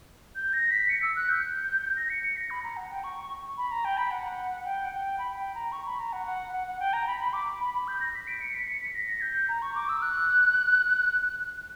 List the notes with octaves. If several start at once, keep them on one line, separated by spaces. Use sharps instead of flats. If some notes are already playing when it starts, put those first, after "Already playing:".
G6
A#6
B6
C#7
E6
F#6
G6
A#6
C#7
C#7
A#6
B5
A#5
F#5
G5
C#6
B5
A#5
G5
B5
F#5
G5
F#5
G5
B5
G5
A#5
C#6
B5
A#5
F#5
F#5
F#5
F#5
G5
A#5
B5
B5
D6
B5
B5
G6
A#6
B6
D7
C#7
B6
C#7
B6
A#6
G6
A#5
C#6
D6
E6
F#6